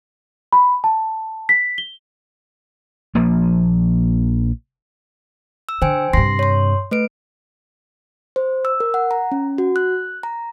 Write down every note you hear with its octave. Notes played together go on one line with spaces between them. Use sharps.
B5
A5
B6
G7
A#1 F3 A#3
E6
D3 C5 G5 G#5
G2 C3 C6 A#6 C7
C#5 C6
A3 B4 D7
C5
E6
A#4
F#5
A#5
C#4
F#4
F#6
A#5